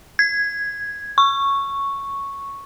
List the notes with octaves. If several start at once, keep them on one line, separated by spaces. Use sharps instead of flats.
G#6
C#6